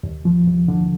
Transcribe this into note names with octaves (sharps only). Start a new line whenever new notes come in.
D#2
F3
D#2
D3